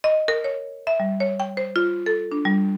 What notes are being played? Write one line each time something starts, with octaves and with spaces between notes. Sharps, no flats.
D#5
A#4
C#5
E5
G3
C#5
G5
C5
F4
A4
D4
G3